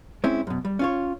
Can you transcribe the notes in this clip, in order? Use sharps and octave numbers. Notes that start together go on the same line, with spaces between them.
G#3 C4 C#4 E4
F#2 B2
G3
C#4 F4 C#5